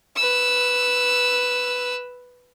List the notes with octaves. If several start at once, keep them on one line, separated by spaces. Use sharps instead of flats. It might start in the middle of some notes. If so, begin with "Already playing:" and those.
B4 E6